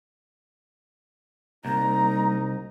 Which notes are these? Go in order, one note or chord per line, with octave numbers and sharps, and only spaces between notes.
C2 G3 A#3 D#4 A#5